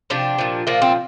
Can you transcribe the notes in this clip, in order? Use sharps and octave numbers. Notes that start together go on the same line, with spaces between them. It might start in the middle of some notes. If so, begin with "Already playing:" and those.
C3 F3 D4 G4
A#2 F3
A#2 F3 A#3 D4
C4